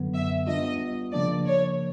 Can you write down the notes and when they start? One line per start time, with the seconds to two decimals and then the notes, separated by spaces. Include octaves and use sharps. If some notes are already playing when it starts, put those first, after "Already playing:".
Already playing: F#2 D3 F#3 B3
0.14 E5
0.47 G3 B3 D4 F4 D#5
1.13 C#3 F3 A#3 D4 D5
1.47 C#5